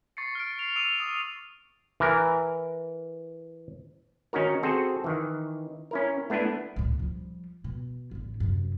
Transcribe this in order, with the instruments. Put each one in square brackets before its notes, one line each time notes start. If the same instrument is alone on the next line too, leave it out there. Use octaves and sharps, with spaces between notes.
[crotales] C#6 A6 C7 C#7
F6 A6 D7
C7 F7
D6 E6 D7 D#7 F7
D#6
[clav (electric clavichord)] E3 A#4
D#3 C#4 D#4 F#4 A#4
C4 F#4 G#4 A4 C5
D#3 E3
C#4 E4 A#4
A3 B3 D4 E4 B4
[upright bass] C#2 A#2
F3 G3
B2
A1 D3
F#2 C3